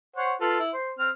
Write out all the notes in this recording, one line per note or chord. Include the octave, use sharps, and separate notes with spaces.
C5 C#5 F#5
F4 A4 B4
E4
C5
C4 F6